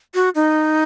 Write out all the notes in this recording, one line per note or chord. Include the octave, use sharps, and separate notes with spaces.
F#4
D#4